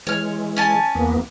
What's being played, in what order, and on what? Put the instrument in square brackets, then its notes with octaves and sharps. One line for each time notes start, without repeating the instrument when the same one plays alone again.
[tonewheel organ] E3 G#3 [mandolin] C#5 F6
[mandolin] C#4 G#5 A5
[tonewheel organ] E2 A#3 B3